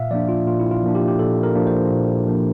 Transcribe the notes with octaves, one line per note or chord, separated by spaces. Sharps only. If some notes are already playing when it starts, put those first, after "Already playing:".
Already playing: A#2 E5 F5
F3 A#3 D4 D5
F4
A#2 F4
E4
F4
F3 A#3 D4
G4
G4
A#2 A4
A#4
F3 A#3 D4
C5
A#2
F3 A#3 D4